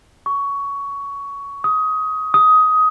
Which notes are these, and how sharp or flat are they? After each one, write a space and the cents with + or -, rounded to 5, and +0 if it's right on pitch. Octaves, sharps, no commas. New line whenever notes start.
C#6 +15
D#6 +20
D#6 +15